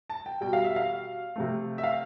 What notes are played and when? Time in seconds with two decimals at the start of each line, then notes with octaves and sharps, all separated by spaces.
0.10 A5
0.26 G5
0.41 B2 G3 G5
0.53 F5
0.64 E5
0.76 F5
1.36 C3 F3 A3
1.78 E5
1.84 F5